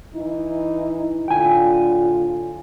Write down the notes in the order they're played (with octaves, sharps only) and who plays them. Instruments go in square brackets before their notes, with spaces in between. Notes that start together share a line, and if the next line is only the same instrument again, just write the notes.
[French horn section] E3 D#4 E4
[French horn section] A2 D3 F4 [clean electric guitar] G5 G#5